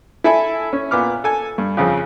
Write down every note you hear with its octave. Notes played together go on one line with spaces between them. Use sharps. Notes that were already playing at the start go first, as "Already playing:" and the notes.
E4 A4 E5 G#5 B5
C#4
A#2 B3 D6 F6
A4 G#5
G2
F2 C#3 F3 C4